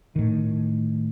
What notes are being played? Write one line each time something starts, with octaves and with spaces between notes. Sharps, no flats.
A2 D#3